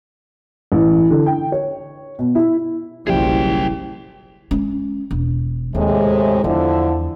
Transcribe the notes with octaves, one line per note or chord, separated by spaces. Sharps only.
A1
D3
G5
C#5
B2
E4
F#1 B1 F3 G3 E4 G#4 G5
G#3 C#4
E1
D#2 A2 C3 G#3
E2 D3 F3 E4